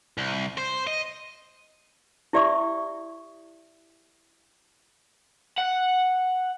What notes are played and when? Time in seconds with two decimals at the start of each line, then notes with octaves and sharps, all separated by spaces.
0.18 C2
0.58 C5
0.87 D#5
2.33 E4 G4 D5 E5 C#6 D#6
5.58 F#5